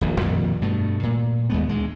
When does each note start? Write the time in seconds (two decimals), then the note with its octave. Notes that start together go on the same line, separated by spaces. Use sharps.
0.01 D#1 A#1
0.21 F2 A#2 D#3 G3
0.62 G2 B2 A3
1.03 A#2
1.50 D#2 G#3 A3 B3
1.69 D2 G#3